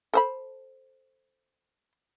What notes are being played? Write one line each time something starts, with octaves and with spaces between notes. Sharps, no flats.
A4 C5 B5